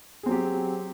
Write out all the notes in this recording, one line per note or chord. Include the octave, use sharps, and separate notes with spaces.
F#3 C4 G4 G#4